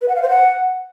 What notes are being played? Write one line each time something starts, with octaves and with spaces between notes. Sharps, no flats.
B4
F#5
F5
C5
F#5